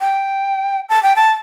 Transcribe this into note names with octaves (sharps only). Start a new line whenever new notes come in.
G5
A5
G5
A5